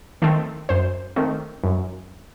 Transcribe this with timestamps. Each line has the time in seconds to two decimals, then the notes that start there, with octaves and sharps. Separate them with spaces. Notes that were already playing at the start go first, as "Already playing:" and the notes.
0.22 D#3 A3 C4
0.69 F#2 C5
1.16 D#3 A3 C4
1.64 F#2